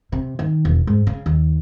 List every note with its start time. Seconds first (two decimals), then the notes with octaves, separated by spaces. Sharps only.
0.12 C3
0.39 D#3
0.65 E1
0.87 G#2
1.07 C#3
1.26 D#2